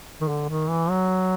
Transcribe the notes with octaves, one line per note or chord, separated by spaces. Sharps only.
D#3
D3
D#3
E3
F#3